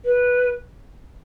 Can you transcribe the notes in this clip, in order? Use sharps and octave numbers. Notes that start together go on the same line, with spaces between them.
B4